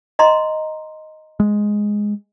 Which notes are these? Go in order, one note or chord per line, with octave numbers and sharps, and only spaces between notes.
D#5 A#5 C6
G#3